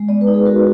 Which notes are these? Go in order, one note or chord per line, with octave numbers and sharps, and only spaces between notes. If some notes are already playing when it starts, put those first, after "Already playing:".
Already playing: G#3
B3 D5
B4
D#4
G#4
F#4 A#4